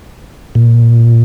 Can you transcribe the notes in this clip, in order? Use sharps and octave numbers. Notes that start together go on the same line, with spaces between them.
A#2